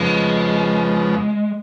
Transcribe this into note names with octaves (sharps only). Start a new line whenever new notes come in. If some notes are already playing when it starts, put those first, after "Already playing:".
Already playing: F2 C#3 F3 G#3 B3